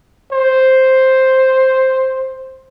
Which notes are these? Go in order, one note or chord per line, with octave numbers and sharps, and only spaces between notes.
C5